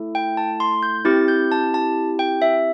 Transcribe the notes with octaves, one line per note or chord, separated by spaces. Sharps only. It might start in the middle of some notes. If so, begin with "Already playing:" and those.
Already playing: A3 E4 A4
G5
A5
C6
G6
C4 E4 G4 A6
G6
A5
A5
G5
E5